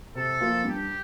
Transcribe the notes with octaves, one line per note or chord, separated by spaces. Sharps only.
C3 A4
F3 A#3 F4
G2 G4